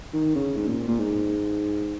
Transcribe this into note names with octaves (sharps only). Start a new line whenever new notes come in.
D#3
C#3
G#2
A#2
A#2
G#2